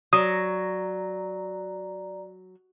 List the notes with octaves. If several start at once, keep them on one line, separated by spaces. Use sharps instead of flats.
F#3 D5 A#5 D#6